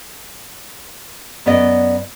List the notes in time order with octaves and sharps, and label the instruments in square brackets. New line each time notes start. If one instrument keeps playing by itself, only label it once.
[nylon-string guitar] F#2 B3 C#4 D5 D#5